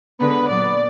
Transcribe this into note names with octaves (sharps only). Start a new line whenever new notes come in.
D3 G#3 B3 B4
A#2 F#3 B3 D5